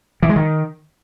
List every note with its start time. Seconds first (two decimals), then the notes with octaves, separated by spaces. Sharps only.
0.23 E3
0.29 G#3
0.36 D#3